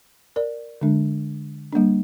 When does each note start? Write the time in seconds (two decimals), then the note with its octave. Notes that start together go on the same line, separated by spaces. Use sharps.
0.36 A#4 D5
0.81 D3 G#3 D4
1.72 G3 A#3 D4